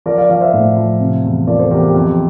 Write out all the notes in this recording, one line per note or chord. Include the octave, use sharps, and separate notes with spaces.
F3 A#4 D5
D5 F5
F3 D5 F5
C5 E5
A2
F3
C3
E2
F3 A#4 D5
A4 C5
E2 G4 A#4
G4
F2